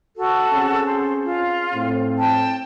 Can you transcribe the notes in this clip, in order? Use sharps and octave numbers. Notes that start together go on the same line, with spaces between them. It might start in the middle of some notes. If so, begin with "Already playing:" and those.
F#4 A4
C4 C#4 G#4
C5
F4
A2 C4
G5 A5